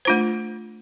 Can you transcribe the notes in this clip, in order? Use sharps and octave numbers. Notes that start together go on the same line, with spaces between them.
A3 D4 F4 C5